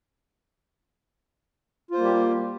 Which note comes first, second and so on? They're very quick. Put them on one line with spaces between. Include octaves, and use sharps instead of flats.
F4 C5 A#3 G3 G4